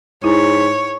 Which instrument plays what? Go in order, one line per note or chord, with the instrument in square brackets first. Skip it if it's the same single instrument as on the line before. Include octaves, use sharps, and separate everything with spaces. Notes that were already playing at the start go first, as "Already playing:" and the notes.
[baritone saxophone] G#2 [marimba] E4 [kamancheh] C#5